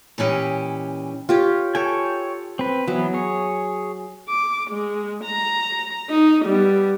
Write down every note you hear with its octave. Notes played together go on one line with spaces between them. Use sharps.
A#2 E3 C#4 G4 D#5
F4 G4 C#5
A4 C#5 G5 G#5
C4 B4
E3 F#3 B3
G#4 C#5
D6
G#3
A#5
D#4
G3 B3